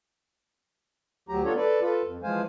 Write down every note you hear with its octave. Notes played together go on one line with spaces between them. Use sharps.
D2 F#3 G4 A#5
B3 D4 F4 A4 C#5
A4 B4 D5
F4 A4 B4
F2
E3 F3 G#3 C5 F5 G#5